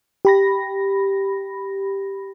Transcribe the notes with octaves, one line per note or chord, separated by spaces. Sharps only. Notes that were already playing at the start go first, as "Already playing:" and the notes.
G4 B5 A#6